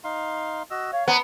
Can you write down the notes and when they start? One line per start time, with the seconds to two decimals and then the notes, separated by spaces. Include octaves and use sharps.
0.04 D#4 F5 C6
0.70 F#4 D#5 E6
0.93 C#5 F5
1.08 B3 A#5